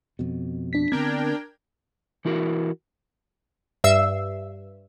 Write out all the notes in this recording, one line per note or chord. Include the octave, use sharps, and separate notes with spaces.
F2 B2
D4 B6
D3 B3 C4 D4 A#4 G5 G#6
E3 E4 F#4 A#4
G2 E5 E6 C7